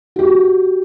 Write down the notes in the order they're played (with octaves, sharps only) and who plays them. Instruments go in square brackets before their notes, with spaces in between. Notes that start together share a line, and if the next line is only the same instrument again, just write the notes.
[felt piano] F#4 G4